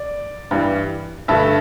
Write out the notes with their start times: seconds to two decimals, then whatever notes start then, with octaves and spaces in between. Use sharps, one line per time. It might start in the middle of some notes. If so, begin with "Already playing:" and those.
Already playing: D5
0.51 G2 E3 G3
1.28 G2 D3 A3 E5 A5